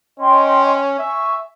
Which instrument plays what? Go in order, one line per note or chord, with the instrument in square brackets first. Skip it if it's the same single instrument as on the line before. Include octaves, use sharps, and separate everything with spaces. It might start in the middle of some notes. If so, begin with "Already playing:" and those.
[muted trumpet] C#4 [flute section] D#5 G5 C6
[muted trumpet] E5 [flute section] G#5 C#6